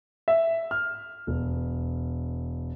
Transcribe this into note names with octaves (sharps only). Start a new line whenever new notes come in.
E5
F6
E1